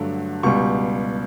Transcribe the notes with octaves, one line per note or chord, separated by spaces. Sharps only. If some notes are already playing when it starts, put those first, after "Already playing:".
Already playing: G2 D3 F#3 A3
C#2 B2 G3 C#6